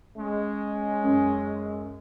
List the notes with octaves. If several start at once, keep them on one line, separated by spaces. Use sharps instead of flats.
G#3 C#4
F#2